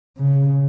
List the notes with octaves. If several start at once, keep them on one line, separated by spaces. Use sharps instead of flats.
C#3